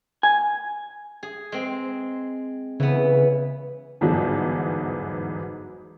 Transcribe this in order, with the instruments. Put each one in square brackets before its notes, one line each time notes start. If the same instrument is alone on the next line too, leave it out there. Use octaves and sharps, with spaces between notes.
[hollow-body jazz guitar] G#5
[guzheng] G#4
G#3 C4
[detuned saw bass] C#3 [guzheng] E3 B3
[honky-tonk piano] G1 E2 G#2 F#3